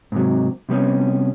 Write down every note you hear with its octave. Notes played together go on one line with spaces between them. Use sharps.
G#2 C3 F#3
C3 G3 B3 C#4